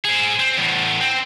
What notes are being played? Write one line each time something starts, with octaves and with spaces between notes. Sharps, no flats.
G#4 C5
C4
E2 A2
C4